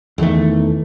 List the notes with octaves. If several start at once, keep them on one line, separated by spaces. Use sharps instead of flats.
E2 D#3 E3 A3